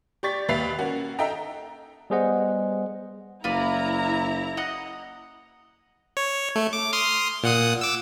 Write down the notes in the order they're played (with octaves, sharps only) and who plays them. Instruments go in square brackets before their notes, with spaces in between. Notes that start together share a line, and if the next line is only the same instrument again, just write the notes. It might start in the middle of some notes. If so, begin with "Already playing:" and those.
[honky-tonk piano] G4 D5 C#6 A6 B6
D#2 B4 E5 A6 C7 F7
A#3 C#4 F#4
A4 D#5 E5 G5 A#5
[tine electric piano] G3 B3 G#4 C5 D#5 F#5
[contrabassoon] F#1 [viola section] E4 A#5 [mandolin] F4 B4 D5
[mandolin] D#5 F#5
[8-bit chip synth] C#5
A3
D6
C6 D#6 F6
A#2 F#5 D#6
D6 E6